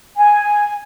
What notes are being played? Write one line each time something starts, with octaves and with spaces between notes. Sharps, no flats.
G#5